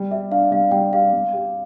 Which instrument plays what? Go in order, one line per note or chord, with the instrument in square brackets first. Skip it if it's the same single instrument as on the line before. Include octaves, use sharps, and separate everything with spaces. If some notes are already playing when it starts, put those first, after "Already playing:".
Already playing: [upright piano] G3 G4
[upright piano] G4 [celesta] E5
[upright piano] D4 [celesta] F5
[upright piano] G3 [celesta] F5
[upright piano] G3 [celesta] G5
[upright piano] G4 [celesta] F5
[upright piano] G3
G4